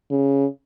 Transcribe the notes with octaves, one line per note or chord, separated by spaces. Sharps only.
C#3